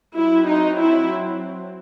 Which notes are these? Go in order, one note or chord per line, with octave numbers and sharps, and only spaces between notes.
F#3 C4 E4
D#4
E4